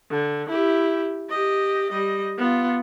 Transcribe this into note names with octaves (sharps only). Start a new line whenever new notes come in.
D3
E4 G4
G4 D#5
G3 D#5
B3 F4